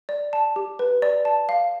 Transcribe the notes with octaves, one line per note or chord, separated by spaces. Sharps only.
D5
A5
G4
B4
D5
A5
F5